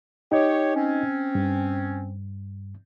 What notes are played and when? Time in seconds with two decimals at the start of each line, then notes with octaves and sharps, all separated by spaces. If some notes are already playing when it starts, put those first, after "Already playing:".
0.32 D#4 G4 C#5 D#5
0.76 C4 C#4
1.35 G2